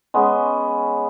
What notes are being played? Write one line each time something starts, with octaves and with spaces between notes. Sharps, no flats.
G#3 B3 C#4